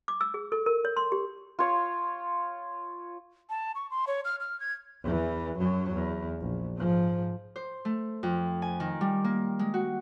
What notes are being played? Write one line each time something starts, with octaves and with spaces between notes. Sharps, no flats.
D6
E6
G#4
A4
A#4
C#5
C6
G4
F4 C#5
A5
C#6
C6
C#5
F6
F6
G#6
E2 E3
F#2 F#3
E2
A#1
G#2 F3
C5
A3
F2
G#5
D#3
G3
A#3
G#3
F#4